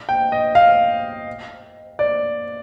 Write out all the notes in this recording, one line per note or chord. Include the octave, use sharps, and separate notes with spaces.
G5
D#5
F5
D5